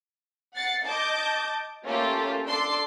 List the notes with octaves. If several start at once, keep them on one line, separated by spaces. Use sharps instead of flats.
F#5 A6 C7 C#7
D#5 A5 D6 G6
A3 A#3 C#4 F4 G4 A4
D4 A4 C6 D6 C7